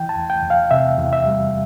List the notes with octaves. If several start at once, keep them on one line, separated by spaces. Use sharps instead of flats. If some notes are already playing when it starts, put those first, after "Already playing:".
Already playing: E3 G5
A5
E2
G5
E2
F5
C3 E5
E2
E5
G3